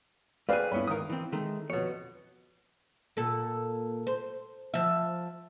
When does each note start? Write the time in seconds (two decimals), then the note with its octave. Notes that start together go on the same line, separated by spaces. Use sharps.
0.49 A3 C4 G#4 B4 D5 F5
0.72 G2 B3 C#4 E4 B5
0.87 G#2 D#3 A#4 F5 D#6
1.10 E3 C4
1.32 D#3 G#3 A3
1.70 F2 B2 C#5
3.17 A#2 A4
4.07 C5
4.74 F3 E5